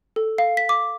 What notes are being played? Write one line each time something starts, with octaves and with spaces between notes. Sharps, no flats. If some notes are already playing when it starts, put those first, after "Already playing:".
A4
F5
B6
D6